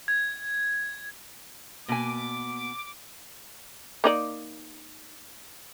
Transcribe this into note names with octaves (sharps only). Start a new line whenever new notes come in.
G#6
B2 A#3 G#5 D6 B6
A#3 D#4 D5